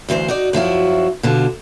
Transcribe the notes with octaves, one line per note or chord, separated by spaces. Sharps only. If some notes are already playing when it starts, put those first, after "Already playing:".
D2 G2 E3 C5
D#4 F#4 D5
F#2 F3 E4 F#4
B2 D3 F4